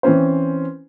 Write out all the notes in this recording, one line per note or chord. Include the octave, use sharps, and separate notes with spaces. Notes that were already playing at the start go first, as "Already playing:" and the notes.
E3 C4 C#4 C5